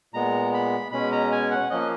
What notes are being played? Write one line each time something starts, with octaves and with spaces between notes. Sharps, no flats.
A#2 G#3 B3 A#5
B5
B2 G#3 C#4 B5
A#5
G#5
F#5
F3 A#3 C#4 D#5